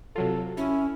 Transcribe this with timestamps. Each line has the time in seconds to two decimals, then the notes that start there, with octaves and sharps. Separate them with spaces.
0.16 C3 F#3 F4 A4
0.57 C#4 E4